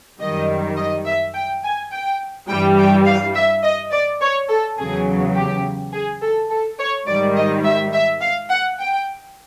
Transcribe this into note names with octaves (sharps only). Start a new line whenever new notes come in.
F#2 D#3 G3 D#5
D#5
E5
G5
G#5
G5
G2 E3 G3 G5
G5
F5
E5
D#5
D5
C#5
A4
E2 C#3 F#3 G#4
G4
G#4
A4
A4
C#5
G#2 D#3 G3 D5
D#5
E5
E5
F5
F#5
G5